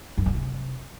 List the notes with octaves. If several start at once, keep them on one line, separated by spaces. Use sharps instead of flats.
F#2
D3
C3